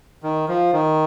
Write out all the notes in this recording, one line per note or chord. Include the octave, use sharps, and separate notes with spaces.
D#3
F3
D#3